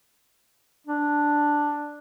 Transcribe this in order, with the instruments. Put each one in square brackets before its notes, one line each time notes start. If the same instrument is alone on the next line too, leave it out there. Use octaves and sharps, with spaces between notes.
[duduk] D4